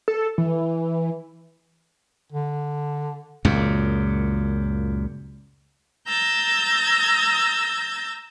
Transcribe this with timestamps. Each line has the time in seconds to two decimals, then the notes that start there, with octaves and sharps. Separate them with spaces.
0.08 A4
0.38 E3
2.32 D3
3.45 C#2 F#2 A#2
6.07 A#5 E6 G6 A6